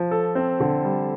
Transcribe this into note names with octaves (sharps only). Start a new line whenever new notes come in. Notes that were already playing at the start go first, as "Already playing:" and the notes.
Already playing: F3
A4
C4
D3
G3